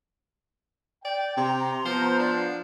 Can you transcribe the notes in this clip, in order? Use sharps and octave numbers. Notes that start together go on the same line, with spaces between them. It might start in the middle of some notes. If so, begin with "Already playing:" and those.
D5 G5
C3 C4 A#5 C6
F3 B3 C5
D4